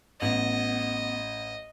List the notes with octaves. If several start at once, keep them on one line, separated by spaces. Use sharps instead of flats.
A1 B3 D#5 F#7